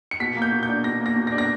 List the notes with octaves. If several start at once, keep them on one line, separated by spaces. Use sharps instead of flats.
C#7
B2 B6
A#3
G6
B2
G6
D4
B2 A#6
A#3
A#6
B2
A#6
D4
A#6